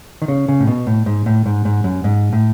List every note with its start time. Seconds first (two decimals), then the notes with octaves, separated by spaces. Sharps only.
0.22 D#3
0.28 C#3
0.48 C#3
0.60 A2
0.67 B2
0.87 A2
1.06 G#2
1.26 A2
1.46 G#2
1.65 G#2
1.84 F#2
2.04 G#2
2.33 A2